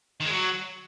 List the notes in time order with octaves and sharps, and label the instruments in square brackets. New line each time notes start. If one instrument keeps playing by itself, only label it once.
[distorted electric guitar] D#3
G#3
F#3